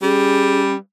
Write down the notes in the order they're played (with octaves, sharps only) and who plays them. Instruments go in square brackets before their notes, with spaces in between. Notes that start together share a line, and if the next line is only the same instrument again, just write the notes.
[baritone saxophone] G3 [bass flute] C#4 [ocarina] G#4